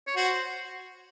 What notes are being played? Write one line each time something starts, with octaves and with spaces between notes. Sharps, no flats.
C#5
F#4 C5